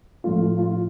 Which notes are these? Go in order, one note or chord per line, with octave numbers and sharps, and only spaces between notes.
A2 F3 A3 F4
F4
F4